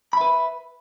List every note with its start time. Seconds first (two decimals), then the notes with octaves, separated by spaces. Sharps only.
0.13 B5
0.17 E5
0.21 B4